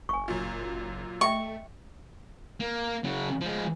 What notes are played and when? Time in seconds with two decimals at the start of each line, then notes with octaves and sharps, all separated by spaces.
0.09 F#1 G#5 C#6
0.28 F#2 A#2
1.21 A3 D#5 E5 G5 C#6
2.60 A#3
3.04 C#3 F#3
3.41 F3 G#3